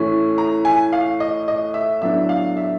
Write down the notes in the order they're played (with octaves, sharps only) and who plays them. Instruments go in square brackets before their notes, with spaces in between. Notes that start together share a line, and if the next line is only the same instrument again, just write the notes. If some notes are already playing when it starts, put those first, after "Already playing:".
Already playing: [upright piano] A2 E3 A3 C#4
A#5
G#5
F5
D#5
D#5
E5
A2 F#3 B3 D4 E5
F5
E5